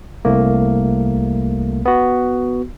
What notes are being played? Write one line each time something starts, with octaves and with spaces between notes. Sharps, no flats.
C2 A3 A#3
B3 F#4